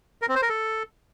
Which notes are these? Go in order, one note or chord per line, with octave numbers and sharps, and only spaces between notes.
A#4
C4
C5
A#4
A4